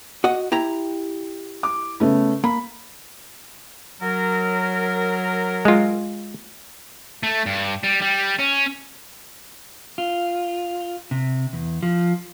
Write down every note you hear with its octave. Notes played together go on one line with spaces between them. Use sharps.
F#4 D#5 F#5
E4 G4 A#5
D6
C#3 A3 B3
A#3 B5
F#3 A#4
G#3 F4
A3
G2
G3
G3
C#4
F4
C3
E2
F3